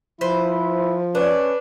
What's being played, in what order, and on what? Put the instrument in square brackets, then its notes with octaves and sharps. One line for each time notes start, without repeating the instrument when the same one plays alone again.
[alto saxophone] F3 [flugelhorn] E4 [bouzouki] B4 C5
[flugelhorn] C#4 [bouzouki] D4 [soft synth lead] B4